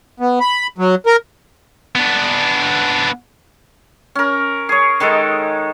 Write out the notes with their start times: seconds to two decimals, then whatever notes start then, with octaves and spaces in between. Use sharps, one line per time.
0.20 B3
0.40 B5
0.78 F#3
1.06 A#4
1.95 B3 D4
4.15 C#4 A#4
4.69 G#4 C#5
5.00 D#3 G#3 D#4 A4